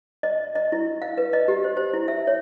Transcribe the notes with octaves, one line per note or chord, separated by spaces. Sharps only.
D#5
D#5
E4
F5
B4
D#5
G4
C5
C5
E4
E5
C#5